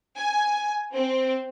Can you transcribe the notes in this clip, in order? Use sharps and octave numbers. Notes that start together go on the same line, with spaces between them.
G#5
C4